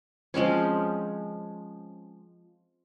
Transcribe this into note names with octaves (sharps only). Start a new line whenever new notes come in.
F3 G#3 C4 C#4